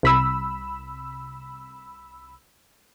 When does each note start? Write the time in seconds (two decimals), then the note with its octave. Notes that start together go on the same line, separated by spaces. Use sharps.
0.03 C2 B5 E6